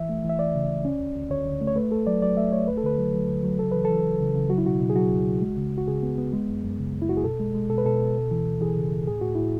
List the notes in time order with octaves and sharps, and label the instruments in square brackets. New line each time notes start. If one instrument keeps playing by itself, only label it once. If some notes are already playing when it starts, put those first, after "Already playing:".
Already playing: [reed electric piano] E3 E5
A3
E3
E5
E3 D5
C#3
C#2
C#4
D2
D2
D2 C#5
D3
A3
C#5
A3 B4
A3 A4
F#3 D5
F#3 D5
A3 E5
A3 C#5
D2 B4
A4
D3 B4
F#3
F#3
D2
F#3
C#3 A4
E3 B4
E3 A4
C#2
C#3
C#3
F#3 F#4
E4
B2 F#4
B2
G#4
F#3 F#4
C#2
C#2
G#3
C#3
C#2
F#4
C#3 G#4
B3
B3
G#3
F#2
F#2
C#3
F#2
E4
F#2 F#4
G#4
B2 A4
G#3
G#3
B2 A4
B4
B2 A4
B2
D2
E3
D2
E3 G#4
C#3
D2
A2 G#4
A2 F#4
A2 E4